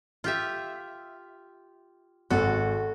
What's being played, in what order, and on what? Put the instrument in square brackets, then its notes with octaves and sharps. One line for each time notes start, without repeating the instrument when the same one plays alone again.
[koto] F4 G4 E5
[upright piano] G#1 [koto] F#4 A4